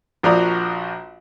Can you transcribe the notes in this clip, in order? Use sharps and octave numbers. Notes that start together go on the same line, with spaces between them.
A#1 F3 F#4 D5 A#5 D#6